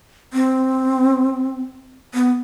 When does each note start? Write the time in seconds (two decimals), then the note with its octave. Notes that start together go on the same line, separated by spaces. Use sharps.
0.33 C4
2.14 B3